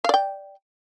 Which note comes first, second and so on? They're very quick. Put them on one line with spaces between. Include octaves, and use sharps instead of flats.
F5 D5 G5